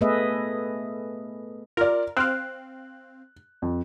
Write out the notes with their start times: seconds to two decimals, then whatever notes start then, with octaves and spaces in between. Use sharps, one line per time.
0.01 A3 B3 G#4 B4 D#5 E5
1.77 F4 A#4 D5
2.17 C4 F5 F#6
3.62 F2